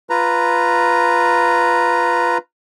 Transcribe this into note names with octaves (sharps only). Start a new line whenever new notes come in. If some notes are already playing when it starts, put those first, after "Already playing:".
F4 B4 A#5